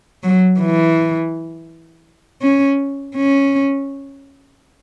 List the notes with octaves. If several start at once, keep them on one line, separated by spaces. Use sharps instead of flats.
F#3
E3
C#4
C#4